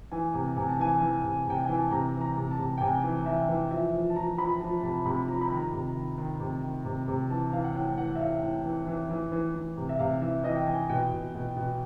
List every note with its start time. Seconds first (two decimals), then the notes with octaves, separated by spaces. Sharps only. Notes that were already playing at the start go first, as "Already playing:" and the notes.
0.11 E3 G#5
0.34 C3
0.56 C3 G#5
0.69 A5
0.79 E3 G#5
1.02 E3
1.24 C3
1.47 C3 G5
1.64 E3 G#5
1.78 A5
1.91 C3 A#5
2.14 E3
2.21 A#5
2.37 C3
2.51 A5
2.59 C3
2.78 G5
2.81 C3 G#5
3.04 E3
3.26 E3 E5
3.49 E3
3.71 F3 E5
3.93 F3
4.10 A5
4.16 F3 A#5
4.38 F3 B5
4.61 F3 A5
4.83 C3 A5
5.06 C3 B5
5.28 F3 A#5
5.41 B5
5.51 D#3
5.56 A#5
5.73 C3
5.95 D#3
6.18 D#3
6.40 C3
6.63 D#3
6.85 C3
7.08 C3
7.30 E3 A5
7.53 E3 F5
7.64 F#5
7.75 A2 G5
7.97 E3 F#5
8.15 E5
8.20 A2 F5
8.42 A2
8.65 E3
8.87 E3
9.09 E3
9.32 E3
9.55 E3
9.77 C3
9.89 E5
9.99 C3 F5
10.22 E3 E5
10.44 E3 D#5
10.56 G5
10.67 E3 G#5
10.89 B2 G5
11.12 B2
11.34 B2
11.56 B2